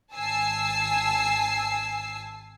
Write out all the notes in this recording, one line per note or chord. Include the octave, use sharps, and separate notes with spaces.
G#1 G#5 A5 E6 C7